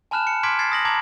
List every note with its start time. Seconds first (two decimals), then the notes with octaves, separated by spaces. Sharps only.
0.11 G#5 A5 B5 F6 F#6 E7
0.27 C#7
0.43 C6 D6 F6 G#6 B6 D7
0.59 F6 G#6 A6 C7
0.72 D#6 A#6 F#7
0.85 A5 A#5 D6 G#6 F#7